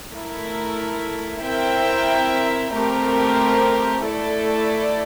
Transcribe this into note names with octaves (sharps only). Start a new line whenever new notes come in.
A3 E4 A#4
C4 E4 A#4 E5 G5
A3 C4 G4 A#4
A3 E4 A4 D5